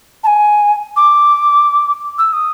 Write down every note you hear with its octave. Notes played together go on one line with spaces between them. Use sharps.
A5
G#5
D6
E6
D#6